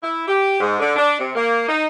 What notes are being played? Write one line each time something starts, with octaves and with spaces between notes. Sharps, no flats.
E4
G4
G#2
D3
D4
C3
A#3
D#4